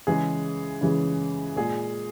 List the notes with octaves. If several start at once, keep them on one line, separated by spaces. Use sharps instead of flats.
C#3 E3 G#3 G#4
C#3 E3 G#3
A#2 G#3 G#4